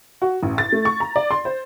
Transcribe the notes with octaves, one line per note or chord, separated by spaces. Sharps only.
F#4
A1
A6
A3
C#6
A#5
D5
C6
C5